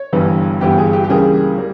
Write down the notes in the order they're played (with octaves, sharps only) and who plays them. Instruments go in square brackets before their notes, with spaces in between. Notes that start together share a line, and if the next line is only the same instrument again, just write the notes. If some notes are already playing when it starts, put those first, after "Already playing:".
Already playing: [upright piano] C#5
G1 G2 E3 G3 B3
G1 G2 E3 G3 B3 G4
G#4
G4
G4
C#2 C#3 E3 G3 A#3 G#4
G3 A#3